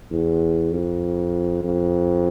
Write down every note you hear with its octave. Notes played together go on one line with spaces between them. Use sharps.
E2
F2
F2